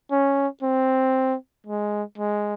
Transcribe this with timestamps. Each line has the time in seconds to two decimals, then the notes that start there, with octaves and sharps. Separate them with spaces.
0.11 C#4
0.63 C4
1.67 G#3
2.18 G#3